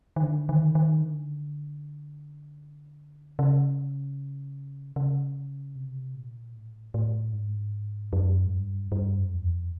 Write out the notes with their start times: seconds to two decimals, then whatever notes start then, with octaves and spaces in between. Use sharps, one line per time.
0.16 D#3
0.23 D3
0.49 D#3
0.75 D#3
1.02 D3
3.39 C#3
4.96 C#3
5.76 C3
6.15 A#2
6.55 A2
6.94 A2
7.33 G#2
8.13 F#2
8.46 G#2
8.52 G2
8.92 G2
9.18 F#2
9.34 E2
9.44 F2